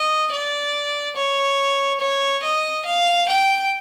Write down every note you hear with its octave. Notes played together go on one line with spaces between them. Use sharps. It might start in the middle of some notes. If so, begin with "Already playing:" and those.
Already playing: D#5
D5
C#5
C#5
D#5
F5
G5